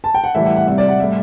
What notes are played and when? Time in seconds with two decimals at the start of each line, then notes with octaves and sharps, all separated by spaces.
0.04 A5
0.14 G5
0.24 F#5
0.34 A2 E3 G3 E5
0.45 F#5
0.56 F#5
0.67 C3 G3 E5
0.78 D5
0.88 F#5
1.00 A2 G3 E5